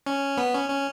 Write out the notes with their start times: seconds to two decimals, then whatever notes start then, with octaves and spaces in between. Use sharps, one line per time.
0.06 C#4
0.37 B3
0.54 C#4
0.70 C#4